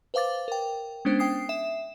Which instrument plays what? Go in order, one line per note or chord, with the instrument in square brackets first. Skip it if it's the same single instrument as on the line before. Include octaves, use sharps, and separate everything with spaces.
[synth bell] B4 C5 F5 D6 A6
A#4 G5
G#3 B3 C#4 D4 C5
G5 D#6 C7
E5 E7